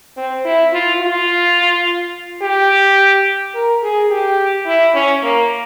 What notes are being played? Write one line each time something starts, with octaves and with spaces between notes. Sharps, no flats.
C4
E4
F4
F4
G4
A#4
G#4
G4
E4
C#4
A#3